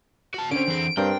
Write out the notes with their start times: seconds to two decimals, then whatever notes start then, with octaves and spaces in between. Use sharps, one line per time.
0.34 F#4 A5
0.51 D3 C4 C#4 D7
0.68 E3 G#4
0.97 G2 C4 D4 A#4 G5